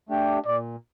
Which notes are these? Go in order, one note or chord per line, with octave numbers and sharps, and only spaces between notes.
A3 D4 G4
A#2 D5